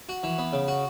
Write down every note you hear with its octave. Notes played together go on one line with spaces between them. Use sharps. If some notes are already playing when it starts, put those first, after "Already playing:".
F#4
E3
B3
C#3
F#4